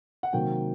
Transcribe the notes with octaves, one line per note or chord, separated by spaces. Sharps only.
F#5
C3 D#3 F#3 A#3 G5